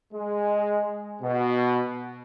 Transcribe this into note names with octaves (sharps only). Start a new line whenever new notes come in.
G#3
B2